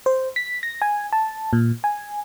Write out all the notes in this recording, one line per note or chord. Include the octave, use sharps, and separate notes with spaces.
C5
B6
A#6
G#5
A5
A#2
G#5